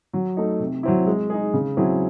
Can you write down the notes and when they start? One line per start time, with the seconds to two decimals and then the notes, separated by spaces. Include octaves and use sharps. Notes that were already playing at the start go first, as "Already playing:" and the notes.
0.14 F#3
0.37 A3 D#4
0.60 C3
0.83 F#3 C4 E4
1.07 G#3
1.30 D#4 G#4
1.54 C#3
1.77 F#3 C4 E4 G#4